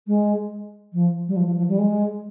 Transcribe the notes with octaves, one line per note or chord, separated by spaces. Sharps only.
G#3
F3
G3
F3
F3
F3
G3
G#3